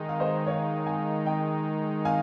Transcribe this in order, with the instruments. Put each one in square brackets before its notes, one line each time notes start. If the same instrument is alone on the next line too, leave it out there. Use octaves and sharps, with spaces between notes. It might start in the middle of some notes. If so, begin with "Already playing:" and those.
Already playing: [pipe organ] D#3 G#3 D#4
[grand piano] F5
C5 D#5
C#5 F5
F5 G#5
D#5 G5
F5 G#5